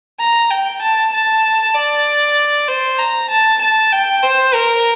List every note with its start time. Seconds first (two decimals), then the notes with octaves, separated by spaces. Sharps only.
0.20 A#5
0.50 G5
0.82 A5
1.13 A5
1.74 D5
2.68 C5
2.99 A#5
3.30 A5
3.61 A5
3.92 G5
4.23 C5
4.54 A#4